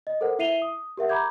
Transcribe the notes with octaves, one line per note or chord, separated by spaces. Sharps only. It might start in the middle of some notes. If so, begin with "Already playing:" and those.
D#5
A4 A#4 C5 F#5
E4 E5 C7 D#7 F7 G7
D#6
G4 A#4 E5 F#5
A#5 B5 D6 G6 G#6